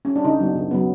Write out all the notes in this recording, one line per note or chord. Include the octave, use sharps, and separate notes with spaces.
C#4
D4
C#3 D#4
F#3 B3
C#3
F#3 B3